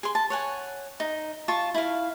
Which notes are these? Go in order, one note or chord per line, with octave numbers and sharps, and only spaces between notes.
G#4 C6
A5
C#5 F#5 G#5
D#4
F4 A5 C#6
E4 F5